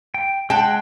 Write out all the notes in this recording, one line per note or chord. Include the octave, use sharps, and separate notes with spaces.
G5
G#3 F#5 G5 A5